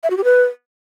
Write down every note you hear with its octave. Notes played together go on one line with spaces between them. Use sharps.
E5
F#4
G4
B4